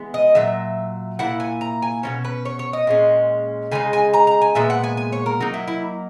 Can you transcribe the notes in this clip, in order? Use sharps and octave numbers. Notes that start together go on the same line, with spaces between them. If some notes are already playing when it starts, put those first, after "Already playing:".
Already playing: E3 G#3 B3
D#5
A#2 F#3 E5
A#2 A#3 E4 F#5
G#5
A#5
G#5
B2 A#3 C#4 C#5
B4
C#5
C#5
D#5
A#2 G#3 C#4
C#3 G#3 D#4 G#5
G#5
A#5
A#5
G#5
A#2 G#3 B3 E5
F#5
G#5
G#5
C#5
A#4
F#3 A#3 D#4 F#4
E4
E4